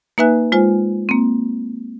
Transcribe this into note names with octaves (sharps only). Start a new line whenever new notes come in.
A#3 D#4 B4 E5 G#5 F#6
G#3 F4 C5 G#5
A#3 C4